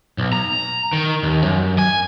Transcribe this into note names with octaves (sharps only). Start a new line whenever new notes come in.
B1
A#5
D#3
D#2
F#2
G#5